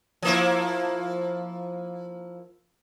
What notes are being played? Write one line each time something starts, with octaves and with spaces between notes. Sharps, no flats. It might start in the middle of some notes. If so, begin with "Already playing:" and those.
F3 A#3 E4